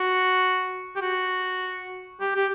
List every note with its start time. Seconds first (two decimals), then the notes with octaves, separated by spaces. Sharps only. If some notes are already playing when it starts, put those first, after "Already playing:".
Already playing: F#4
0.96 G4
1.01 F#4
2.20 G4
2.36 G4